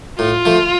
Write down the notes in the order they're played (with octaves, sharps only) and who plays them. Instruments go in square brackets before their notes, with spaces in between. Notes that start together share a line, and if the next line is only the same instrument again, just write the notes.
[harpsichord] A2 [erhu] F4
[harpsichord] F3 A3